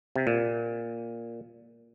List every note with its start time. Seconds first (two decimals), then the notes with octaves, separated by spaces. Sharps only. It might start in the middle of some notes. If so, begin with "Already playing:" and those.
0.16 C3
0.27 A#2